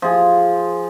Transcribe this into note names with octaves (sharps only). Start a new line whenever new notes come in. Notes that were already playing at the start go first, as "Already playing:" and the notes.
F3 G#4